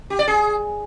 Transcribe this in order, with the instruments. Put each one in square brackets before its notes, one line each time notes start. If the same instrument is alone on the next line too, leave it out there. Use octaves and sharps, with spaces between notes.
[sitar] G4
D5
G#4